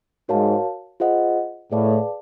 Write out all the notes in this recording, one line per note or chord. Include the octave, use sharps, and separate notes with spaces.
G#2 F#4 A#4 C#5 F5 A5
F4 G#4 C5 D#5 F#5
A2 G#4 B4 D5 F5 A5